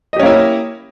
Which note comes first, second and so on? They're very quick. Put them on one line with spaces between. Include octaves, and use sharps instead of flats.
D#5 G4 C#4 A#3 E4